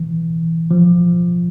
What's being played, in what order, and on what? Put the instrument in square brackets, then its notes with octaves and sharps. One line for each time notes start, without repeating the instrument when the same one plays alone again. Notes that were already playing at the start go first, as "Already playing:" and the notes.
Already playing: [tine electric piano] E3
F3